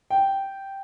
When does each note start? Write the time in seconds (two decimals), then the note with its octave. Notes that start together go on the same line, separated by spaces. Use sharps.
0.10 G5